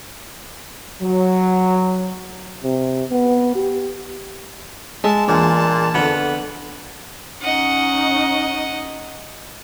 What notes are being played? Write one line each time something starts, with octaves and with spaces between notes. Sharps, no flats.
F#3
C3
B3
G4
G#3 E5 A5
A#1 E2 A#2 A5
F2 D3 B3
C#4 D#4 D#5 F#5